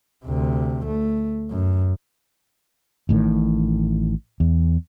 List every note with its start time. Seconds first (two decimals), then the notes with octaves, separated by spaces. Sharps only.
0.25 D2 C3
0.85 A3
1.51 F#2
3.09 A1 A2 D#3
4.40 E2